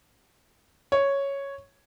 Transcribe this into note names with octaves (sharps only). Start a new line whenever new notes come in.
C#5